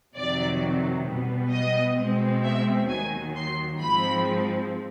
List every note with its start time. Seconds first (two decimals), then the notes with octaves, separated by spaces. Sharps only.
0.15 F2 C3 D#3 F#3 D5
1.07 B2 G3 B3
1.52 D#5
1.98 B2 G#3 C4
2.44 E5
2.89 D#2 D#3 F#3 G#5
3.35 C6
3.80 G#2 F3 G#3 C4 B5